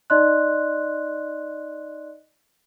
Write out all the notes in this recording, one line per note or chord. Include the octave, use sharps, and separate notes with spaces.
D#4 D5 D#5 C6 F#6